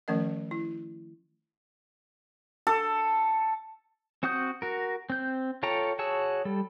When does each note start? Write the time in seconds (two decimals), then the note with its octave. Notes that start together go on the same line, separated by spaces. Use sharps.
0.08 D#3 F3 A3 C#4 A#4 D#5
0.51 E4
2.67 A4
4.23 C4 F#4 F#5 D#6 G6
4.62 F#4 A#4
5.10 C4 G6
5.63 F4 A4 C#5 G5 A#5
5.99 F#4 G#4 C#5 A5 E6
6.45 G3 A4